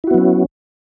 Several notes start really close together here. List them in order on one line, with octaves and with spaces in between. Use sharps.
E4 F#4 B3 F#3 C#4